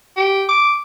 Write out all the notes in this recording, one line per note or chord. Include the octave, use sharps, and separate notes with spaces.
G4
D6